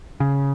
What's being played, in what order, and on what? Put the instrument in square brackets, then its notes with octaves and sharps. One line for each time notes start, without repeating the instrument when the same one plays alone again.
[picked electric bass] C#3